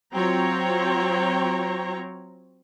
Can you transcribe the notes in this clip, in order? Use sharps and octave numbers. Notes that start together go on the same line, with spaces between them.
F#3 C4 F4 C#5 G5 A#5